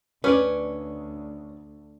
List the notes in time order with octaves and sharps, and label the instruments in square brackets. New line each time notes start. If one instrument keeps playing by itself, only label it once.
[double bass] D2 [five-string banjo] C#4 [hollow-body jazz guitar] B4 D5